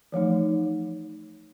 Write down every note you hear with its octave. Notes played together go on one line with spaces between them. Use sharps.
E3 F3 A3 D#4